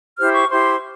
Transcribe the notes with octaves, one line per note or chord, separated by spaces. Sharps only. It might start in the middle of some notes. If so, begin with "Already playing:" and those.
E4 G4 C5 F6
C#6
E4 G4 C5 C6